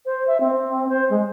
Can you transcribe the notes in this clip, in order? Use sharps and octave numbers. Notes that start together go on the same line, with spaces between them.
C5
E5
C4
C5
G#3